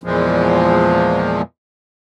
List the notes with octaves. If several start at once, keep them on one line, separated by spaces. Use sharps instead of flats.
E2 A#2 F3 G#3